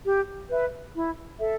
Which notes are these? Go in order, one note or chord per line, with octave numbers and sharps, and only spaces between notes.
G4
B4 E5
E4
A4 E5